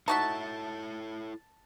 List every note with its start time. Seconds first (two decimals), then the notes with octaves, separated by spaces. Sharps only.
0.08 D#4 E4 F#4 A4 C#5 E5 A5